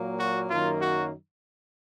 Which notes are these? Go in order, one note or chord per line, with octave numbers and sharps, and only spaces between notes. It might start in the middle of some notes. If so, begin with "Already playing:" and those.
Already playing: A#2 F#3 A#3
F#4
F#2 D#3 F#3 A#3 F4
F#4